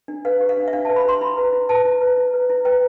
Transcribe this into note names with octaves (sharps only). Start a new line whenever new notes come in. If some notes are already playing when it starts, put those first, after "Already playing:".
D4
B4 F5
G4
F5
D4
E5
D4 F5
A5
B4
B5
G4 C6
E4 B5
B4
E4
B4 A5
E4
B4
E4
B4
E4
B4 G5